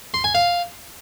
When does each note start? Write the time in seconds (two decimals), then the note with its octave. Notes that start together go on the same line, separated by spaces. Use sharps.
0.14 C6
0.24 G#5
0.35 F5